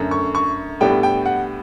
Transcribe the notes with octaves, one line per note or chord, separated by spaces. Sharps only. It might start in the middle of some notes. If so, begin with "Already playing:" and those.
Already playing: F#2 D3 A3
C#6
C#6
A2 G3 B3 D4 G5
G5
F#5